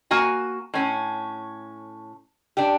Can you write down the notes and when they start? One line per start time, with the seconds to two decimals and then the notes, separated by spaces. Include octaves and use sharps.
0.11 A#3 F#4 G#5
0.74 A2 C#4
2.57 D4 G4